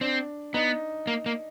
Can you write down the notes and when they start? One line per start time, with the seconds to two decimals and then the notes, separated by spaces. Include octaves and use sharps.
0.01 C4 D4
0.54 B3 D#4
1.07 A#3
1.26 A#3